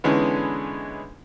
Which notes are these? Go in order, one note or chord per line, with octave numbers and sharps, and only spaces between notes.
D3 E3 G#3 B3 C#4 D#4